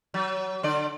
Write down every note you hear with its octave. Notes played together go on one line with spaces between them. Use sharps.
F#3
D3 D5